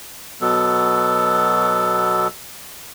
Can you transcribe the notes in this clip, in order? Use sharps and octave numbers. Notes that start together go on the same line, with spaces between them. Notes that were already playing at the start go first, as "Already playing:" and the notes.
B2 F#3 B3 A4